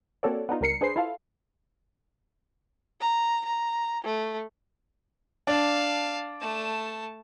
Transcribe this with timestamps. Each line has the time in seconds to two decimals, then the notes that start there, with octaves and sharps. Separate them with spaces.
0.23 A#3 C4 F#4 A4 C#5 D5
0.49 B3 D4 D#4 F4
0.61 C#2 G3 A#4 C7 C#7
0.81 D4 G#4 B4 C5 C7
0.96 E4 F4 A4 F5
3.01 A#5
3.46 A#5
4.04 A3
5.47 D4 F5 A5
6.41 A3 A5